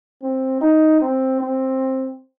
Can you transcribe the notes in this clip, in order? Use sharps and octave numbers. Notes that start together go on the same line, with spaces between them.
C4
D#4
C4
C4